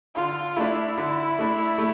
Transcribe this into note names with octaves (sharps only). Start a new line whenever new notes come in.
D3 F4
A3 D4 E4
D3
A3 D4
A3